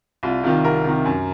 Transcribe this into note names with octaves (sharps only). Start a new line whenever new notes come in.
C2 F4
C3 D#3 F4
C2 A#4
C3 D#3
F#2